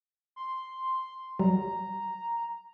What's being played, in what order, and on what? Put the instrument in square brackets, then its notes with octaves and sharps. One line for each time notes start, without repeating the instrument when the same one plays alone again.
[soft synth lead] C6
[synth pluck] F#3 G3 [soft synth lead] A#5